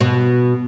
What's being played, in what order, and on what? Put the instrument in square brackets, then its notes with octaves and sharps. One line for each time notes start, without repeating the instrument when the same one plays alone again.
[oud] B2